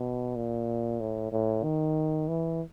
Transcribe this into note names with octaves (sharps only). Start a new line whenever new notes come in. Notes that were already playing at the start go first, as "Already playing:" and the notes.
Already playing: B2
A#2
A2
A2
D#3
E3